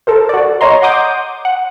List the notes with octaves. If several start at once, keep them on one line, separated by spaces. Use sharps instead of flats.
A4 A#4 C5
F#4 D5
C#5 D#5 A#5 C6
F#5 C6 D6 D#6 G6
F#5